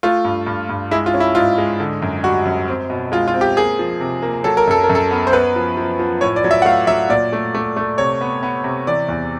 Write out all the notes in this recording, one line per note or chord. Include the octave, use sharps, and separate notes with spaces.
A3 F4
G2
G2
G2
G#3 E4
F4
C#4
E4
G#2 F4
G#3
D3
F#2
G3 F#4
F#2
C4
B2
G#3 F4
F4
C4
G4
A#3 G#4
F3
C3
A#3
F#3 A4
A#4
F#2 A4
A#4
F#2
A4
B3
C5
B3 B4
F3
F3
F3
A2 C#5
D5
F#3
E5
F#5
A3 F5
F#3 E5
A#2 D5
A3
A3
A3
C3 C#5
B3
B3
C3
E3 D5
E2